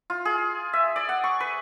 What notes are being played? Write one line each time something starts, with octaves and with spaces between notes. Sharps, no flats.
F4
G#4
E5
D5
F#5
C#6
B4